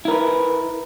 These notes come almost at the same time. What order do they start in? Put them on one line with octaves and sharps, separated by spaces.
E4 A#4 B4